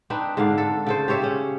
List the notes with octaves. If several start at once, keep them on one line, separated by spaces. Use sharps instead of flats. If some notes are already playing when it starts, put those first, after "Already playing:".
C4 D4 D#4 B4
G#2 D3 D4 F5
A4
C#3 A4 C5
G4 C5 C#5 E5
C#3 C#4